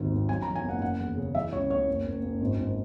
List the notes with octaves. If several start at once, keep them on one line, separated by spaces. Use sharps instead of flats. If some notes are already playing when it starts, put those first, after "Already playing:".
Already playing: G#1 D#2 D#3
G#1
F#2 G#5
A#5
E3
G#5
F#1 F#5
F#1 F#5
E2
C#3
E3 E5
C#2 C#5
C#2 C#5
F#1
F#1
F#1
G#1
G#1